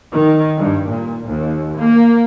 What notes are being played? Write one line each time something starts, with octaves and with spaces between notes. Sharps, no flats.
D#3
G2
A#2
D#2
A#3